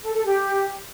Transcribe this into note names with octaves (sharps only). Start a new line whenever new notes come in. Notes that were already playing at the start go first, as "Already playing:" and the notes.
A4
A4
G4